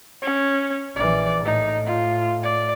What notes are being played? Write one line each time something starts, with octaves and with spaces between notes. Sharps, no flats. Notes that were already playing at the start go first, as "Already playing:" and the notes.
C#4
A#1 E3 D5
A2 D#4
F4
D5